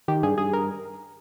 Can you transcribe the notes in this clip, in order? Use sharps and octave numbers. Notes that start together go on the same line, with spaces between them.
D#3 G4
G2 G#4
G2 G#4
A#4